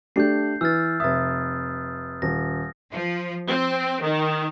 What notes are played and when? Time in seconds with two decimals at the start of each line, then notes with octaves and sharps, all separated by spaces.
0.16 A3 D4 G4 G6 C7
0.61 E3 E6 F6 A6
1.00 F1 E5 D#6 A6
2.22 D#1 A#6
2.91 F3
3.48 C4
4.03 D#3